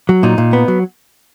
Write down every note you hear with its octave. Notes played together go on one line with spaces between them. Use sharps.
F#3
A#2 D#4
A#2
B3
F#3